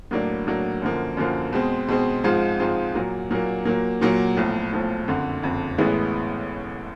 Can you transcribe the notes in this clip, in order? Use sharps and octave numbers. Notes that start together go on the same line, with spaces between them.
A2 F#3 A#3 D4
A2 F#3 A#3 D4
F#2 D3 F3 A#3
F#2 D3 F3 A#3
B2 G#3 C4
B2 G#3 C4
G#2 F3 G#3 C4 F4
G#2 F3 G#3 C4 F4
A#2 F#3 A#3
A#2 F#3 A#3
A#2 F#3 A#3
A#2 F#3 A#3
B1 A2 F3
B1 A2 F3
F#1 F2 D3
F#1 F2 D3
A1 A2 E3 G#3 B3